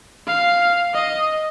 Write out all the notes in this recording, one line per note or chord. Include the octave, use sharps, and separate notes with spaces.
F5
D#5